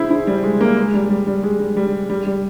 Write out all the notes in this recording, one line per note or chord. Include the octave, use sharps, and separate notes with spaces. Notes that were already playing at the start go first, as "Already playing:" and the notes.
Already playing: E4 G#4 C5
E4
G3
G#3
A#3
G#3
G3
G3
G3
G#3
G3
G3
G3
G3